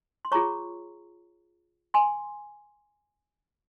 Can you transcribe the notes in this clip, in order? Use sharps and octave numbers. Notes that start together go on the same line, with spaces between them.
C6
F4 G#4 C#5 A#5 C#6
G#5 C6